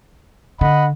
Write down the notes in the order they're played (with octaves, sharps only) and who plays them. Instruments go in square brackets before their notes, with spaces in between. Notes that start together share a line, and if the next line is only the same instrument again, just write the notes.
[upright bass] D3 [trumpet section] D#5 F#5 B5